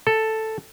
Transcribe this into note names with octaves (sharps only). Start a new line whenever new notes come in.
A4